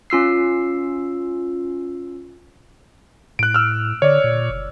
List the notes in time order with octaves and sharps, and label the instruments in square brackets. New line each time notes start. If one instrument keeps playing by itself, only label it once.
[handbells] C#4 F4 E6 C7
[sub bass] A2 [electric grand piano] F#6 D7
[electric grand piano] E6 F6
[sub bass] D3 [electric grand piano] C#5 D5
[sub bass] A#2
F#1